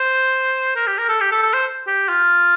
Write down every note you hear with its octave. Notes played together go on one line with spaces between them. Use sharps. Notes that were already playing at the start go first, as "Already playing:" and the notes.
Already playing: C5
A#4
G4
A#4
A4
G4
A4
A4
C5
G4
F4